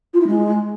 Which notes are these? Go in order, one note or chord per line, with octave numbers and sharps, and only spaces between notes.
F4
E4
G#3